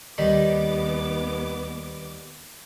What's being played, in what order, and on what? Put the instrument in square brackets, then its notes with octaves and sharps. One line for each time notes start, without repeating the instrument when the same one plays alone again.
[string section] D#2 B3 D6 [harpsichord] D#3 G3 D#4